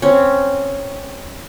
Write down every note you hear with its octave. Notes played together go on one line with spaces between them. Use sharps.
C4 C#4